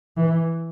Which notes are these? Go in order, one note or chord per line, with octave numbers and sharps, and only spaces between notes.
E3